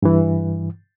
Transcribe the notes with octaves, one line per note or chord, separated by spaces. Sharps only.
G2 E3